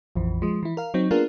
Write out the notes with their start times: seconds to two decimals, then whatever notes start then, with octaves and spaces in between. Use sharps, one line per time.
0.16 A#1 F2 E3
0.42 F3 G#3
0.63 E3 E4
0.77 A#4 F5
0.94 F#3 C4 D#4
1.11 A#3 B3 D4 F4 G#4 A#4